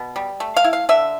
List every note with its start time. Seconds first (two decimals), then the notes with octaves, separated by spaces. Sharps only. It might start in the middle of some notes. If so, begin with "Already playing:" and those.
Already playing: B2
0.16 G3
0.40 A3
0.57 F5
0.64 E4
0.73 F5
0.89 D3 E5